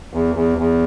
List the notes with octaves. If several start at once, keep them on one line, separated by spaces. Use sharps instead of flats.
E2
E2
E2